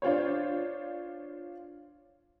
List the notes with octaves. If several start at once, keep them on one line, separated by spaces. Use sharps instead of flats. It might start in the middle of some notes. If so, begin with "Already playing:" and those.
D4 F4 C5 C#5